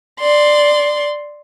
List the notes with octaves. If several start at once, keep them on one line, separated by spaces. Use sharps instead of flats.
D5 C6